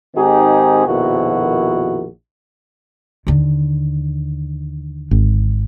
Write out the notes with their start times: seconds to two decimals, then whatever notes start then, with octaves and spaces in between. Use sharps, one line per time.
0.15 G#2 D#3 C4 D#4 G4 G#4
0.86 A#1 F2 B2 D#3 E4 F#4
3.27 D#2 D3
5.11 G#1